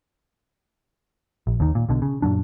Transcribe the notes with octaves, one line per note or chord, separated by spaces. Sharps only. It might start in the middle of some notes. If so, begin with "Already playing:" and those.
A#1
D#2 D#3
A#2
B1 B2 D3
C#3
F#2 A#2 F#3 D4